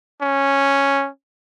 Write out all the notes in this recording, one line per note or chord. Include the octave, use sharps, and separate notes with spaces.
C#4